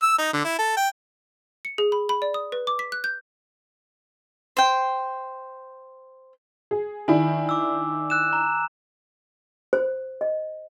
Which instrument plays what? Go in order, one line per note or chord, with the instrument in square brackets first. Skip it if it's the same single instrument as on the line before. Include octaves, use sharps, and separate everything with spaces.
[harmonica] E6
D#4
D3
E4
A4
G5
[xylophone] C#7
G#4
B5
B5
D5
D#6
B4
D6
B6
F#6
G6
[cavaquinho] C5 G5
[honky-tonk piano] G#4
[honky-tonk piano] D#3 D4 E4 [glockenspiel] G#5
[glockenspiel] D6 E6
E6 F#6 E7
A#5
[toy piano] C5
D#5